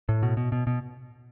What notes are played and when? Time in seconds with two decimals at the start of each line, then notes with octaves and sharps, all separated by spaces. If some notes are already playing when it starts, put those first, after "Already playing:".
0.09 A2
0.23 B2
0.37 B2
0.52 B2
0.67 B2